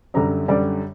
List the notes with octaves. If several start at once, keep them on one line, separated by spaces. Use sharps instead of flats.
F#2 D3 G3 A#5
F#2 D3 G3 D5